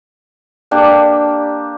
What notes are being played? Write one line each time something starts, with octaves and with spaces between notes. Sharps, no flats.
A#3 D4 G4